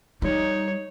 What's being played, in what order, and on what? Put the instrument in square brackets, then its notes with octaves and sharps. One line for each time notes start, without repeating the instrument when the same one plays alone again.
[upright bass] G3 [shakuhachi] D#4 [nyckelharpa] C#5